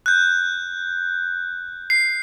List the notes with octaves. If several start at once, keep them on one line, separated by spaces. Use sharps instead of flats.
F#6 G6
C7